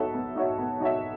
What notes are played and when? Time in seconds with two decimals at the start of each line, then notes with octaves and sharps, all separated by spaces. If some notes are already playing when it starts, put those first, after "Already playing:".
Already playing: B3 D#4 F#4 A4 C#5 E5
0.14 B3
0.36 D#4 F#4 C#5 E5
0.58 B3
0.80 D#4 F#4 C#5 E5